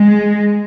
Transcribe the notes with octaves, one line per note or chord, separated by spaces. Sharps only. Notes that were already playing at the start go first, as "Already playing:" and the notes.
Already playing: G#3